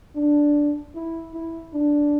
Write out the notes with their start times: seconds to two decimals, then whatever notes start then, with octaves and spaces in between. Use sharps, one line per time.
0.16 D4
0.95 E4
1.34 E4
1.74 D4